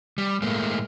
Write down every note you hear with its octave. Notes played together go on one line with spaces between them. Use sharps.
G3
A2 G#3 A#3